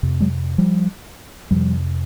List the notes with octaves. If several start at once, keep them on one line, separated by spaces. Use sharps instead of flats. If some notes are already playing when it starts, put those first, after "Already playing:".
F2 C3
F#3 G#3
F3 G3
F2 C3 F3 G3